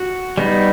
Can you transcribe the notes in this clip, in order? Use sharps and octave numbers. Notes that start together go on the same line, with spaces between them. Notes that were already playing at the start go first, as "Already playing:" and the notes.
Already playing: F#4
G3 B3 D#4